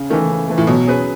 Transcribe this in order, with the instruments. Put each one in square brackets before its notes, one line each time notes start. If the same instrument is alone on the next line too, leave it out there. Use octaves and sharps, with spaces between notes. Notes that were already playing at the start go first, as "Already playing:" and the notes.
Already playing: [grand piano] C#3
[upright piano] D#3 [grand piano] E3 A3
[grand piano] C#3
E3 A3
[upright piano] A2
[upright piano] B2 [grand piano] F#3
[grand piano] C#4 G#4 B4